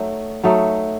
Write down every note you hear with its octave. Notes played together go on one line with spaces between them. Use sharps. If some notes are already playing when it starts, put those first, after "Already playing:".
Already playing: F#3 A3 D#4
F#3 A3 D#4